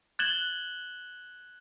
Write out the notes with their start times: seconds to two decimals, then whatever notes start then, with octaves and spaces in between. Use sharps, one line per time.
0.19 F#6 G#6 A6 E7 F#7 G7